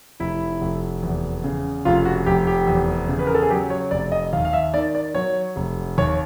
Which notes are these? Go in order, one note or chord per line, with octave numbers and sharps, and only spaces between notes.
F1 E4
F1
E2
C#3
F1 F4
F#4
F1 G4
G4
E2
C#3
B4
A#4
A4
G#4
F#3 G4
C#5
F1 D5
D#5
D#2 F5
F5
E5
D#3 D5
D5
F#3 C#5
F1
D#2 C#5